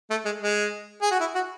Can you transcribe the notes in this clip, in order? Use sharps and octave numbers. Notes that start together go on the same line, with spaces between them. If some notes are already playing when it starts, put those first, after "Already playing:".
A3
G#3
G#3
G#4
F#4
E4
F#4